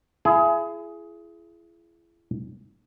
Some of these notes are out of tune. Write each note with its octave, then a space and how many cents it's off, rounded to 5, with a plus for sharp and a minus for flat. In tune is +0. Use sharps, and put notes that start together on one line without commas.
E4 +40 G#4 +15